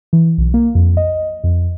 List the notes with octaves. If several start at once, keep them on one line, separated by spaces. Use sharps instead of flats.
E3
B1
A#3
F2
D#5
F2